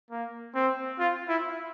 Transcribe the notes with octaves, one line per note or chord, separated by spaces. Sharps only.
A#3
C4
F4
E4